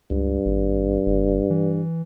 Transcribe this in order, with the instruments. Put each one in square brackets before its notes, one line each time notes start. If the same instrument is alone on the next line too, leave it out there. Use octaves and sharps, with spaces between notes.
[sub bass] C#2 [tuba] G2
[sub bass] G#1
F#1
E3